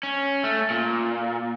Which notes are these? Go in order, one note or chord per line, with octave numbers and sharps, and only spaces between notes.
C#4
A3
A#2